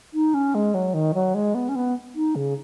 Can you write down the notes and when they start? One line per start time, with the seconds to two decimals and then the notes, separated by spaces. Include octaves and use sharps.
0.14 D#4
0.34 C#4
0.55 G#3
0.74 F#3
0.94 D#3
1.14 F#3
1.35 G#3
1.55 B3
1.69 C#4
1.76 B3
2.15 D#4
2.36 C#3